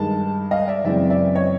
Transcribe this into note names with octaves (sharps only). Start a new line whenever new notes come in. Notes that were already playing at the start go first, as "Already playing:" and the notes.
Already playing: G2 D#3 G#3 A5
D#5 F5
D5 E5
F#2 C#3 E3 G#3 C4 D5 E5
D5 E5
C#5 D#5